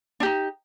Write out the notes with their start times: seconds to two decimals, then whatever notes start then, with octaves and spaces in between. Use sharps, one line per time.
0.20 D4
0.23 G4
0.25 D#4